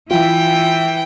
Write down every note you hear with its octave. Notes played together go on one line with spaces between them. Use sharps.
E3 F4 G5